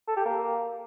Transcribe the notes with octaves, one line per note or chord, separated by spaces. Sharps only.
A4
G4
A#3